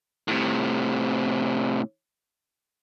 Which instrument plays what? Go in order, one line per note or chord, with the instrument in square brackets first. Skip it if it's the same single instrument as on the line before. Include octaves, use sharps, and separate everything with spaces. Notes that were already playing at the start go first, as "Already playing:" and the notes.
[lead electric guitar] A2 C3